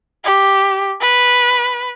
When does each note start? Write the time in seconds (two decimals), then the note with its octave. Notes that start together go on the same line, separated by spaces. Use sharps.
0.25 G4
1.01 B4